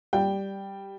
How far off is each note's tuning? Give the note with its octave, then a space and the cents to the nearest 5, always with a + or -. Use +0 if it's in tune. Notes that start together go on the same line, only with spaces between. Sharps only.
G3 +0 G5 +0